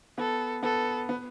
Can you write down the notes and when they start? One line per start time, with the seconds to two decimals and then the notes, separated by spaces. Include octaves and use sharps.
0.18 B3 A4
0.63 B3 A4
1.09 B3